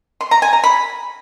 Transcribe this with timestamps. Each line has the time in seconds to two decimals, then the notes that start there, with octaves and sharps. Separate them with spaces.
0.21 C6
0.31 A#5
0.42 G#5
0.53 A#5
0.64 B5